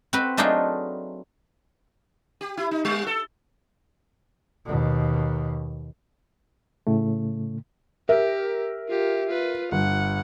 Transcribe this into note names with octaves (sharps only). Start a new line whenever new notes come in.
C4 F#4 B4
F#3 A3 D4 D#4 F4 G#4
G4
E4
D#4
G3
A4
D#2 B2
A2 C#3 A3
G4 A#4 E5
F4 G4
F4 B4
G1 F#5